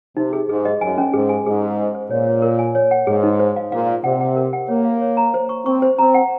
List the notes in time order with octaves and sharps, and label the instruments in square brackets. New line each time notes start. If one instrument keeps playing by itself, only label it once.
[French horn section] C3 [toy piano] D#4
[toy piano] G#4
[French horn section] G#2 [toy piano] G#4
[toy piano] D#5
[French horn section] F#2 [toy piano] G#5
[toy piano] C#4
[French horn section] G#2 [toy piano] G#4
[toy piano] G#5
[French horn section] G#2 [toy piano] G#4
[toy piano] G#4
C5
C5
[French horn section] A#2 [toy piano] C#5
[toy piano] C#5
A#4
G#5
C#5
F#5
[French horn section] G#2 [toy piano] G#4
[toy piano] D#4
C5
F5
[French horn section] A#2 [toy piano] F5
[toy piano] F5
[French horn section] C3 [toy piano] F#5
[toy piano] F#5
A#4
F#5
[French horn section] A#3 [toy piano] C#5
[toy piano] F5
C#5
A#5
C5
C#6
[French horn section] C4 [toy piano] C#6
[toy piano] C5
[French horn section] C4 [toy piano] A#5
[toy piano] F#5